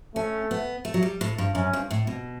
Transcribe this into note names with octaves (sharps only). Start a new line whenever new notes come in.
A3 C#4
B3
A3
F#3
G3
A2
G2
F#2 C#4
G2
A2
B2